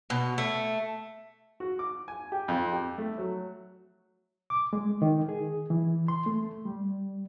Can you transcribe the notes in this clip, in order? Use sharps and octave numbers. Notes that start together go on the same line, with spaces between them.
B2
A3
F#4
D6
G#5
G4
F2
G4
A3
F#3
D6
G#3
D#3
G#4
E3
C6
A3
G3